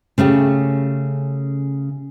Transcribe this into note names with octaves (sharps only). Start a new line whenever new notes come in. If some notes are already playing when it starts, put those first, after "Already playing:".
C#3 A3 C#4 G4